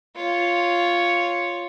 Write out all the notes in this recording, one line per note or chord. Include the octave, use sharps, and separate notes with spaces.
F4 C#5